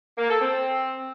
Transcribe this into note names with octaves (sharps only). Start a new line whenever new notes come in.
A#3
A4
C4